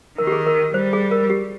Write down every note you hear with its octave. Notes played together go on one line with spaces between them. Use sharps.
D#3 A#4
G4
G#4
A#4
G3 C5
G#4
A#4
G4